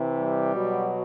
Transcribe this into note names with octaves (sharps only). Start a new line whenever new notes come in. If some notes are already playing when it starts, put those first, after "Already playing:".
Already playing: C3 E3
G3
B2 F#3